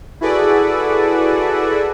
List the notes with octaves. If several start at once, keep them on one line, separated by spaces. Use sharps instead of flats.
E4 F#4 G#4 A4 B4 D5